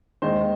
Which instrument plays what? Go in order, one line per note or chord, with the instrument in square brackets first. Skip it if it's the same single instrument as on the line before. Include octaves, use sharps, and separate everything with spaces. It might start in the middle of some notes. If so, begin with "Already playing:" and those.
[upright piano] D#2 D#3 G#3 C5 D#5